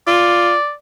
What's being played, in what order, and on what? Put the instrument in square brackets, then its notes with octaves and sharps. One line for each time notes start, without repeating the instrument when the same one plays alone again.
[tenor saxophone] F4 [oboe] D5